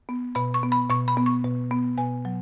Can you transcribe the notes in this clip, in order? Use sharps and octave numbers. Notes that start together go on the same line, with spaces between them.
B3
B2 B5
C#6
B3
B5
B2 C#6
B5
B3
C#6
B2
B3
B2 G#5
F#3